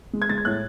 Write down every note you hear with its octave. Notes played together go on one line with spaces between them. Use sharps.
G#3
G#6
G#3 A6
G#6
A2 F#6